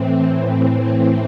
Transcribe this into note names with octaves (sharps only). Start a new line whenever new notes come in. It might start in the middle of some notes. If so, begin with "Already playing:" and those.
Already playing: A2 E3 C4
C4